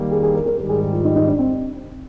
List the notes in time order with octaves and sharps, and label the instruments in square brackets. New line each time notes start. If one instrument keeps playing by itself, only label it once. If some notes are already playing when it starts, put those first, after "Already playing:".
Already playing: [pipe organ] D#3 G3 A#3
[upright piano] G#4
G#4
A#4
A#4
[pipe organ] G#2 D#3 G3 [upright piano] A#4
[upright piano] G#4
G4
F4
D#4
D#4
D4
C4